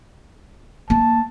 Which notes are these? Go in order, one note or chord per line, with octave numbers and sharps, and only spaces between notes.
A#3 A5